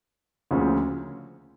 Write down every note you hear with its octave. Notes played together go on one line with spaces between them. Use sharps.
D2 C#3 F3 A#3 C#4